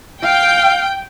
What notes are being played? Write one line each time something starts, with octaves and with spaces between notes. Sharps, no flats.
F5 G5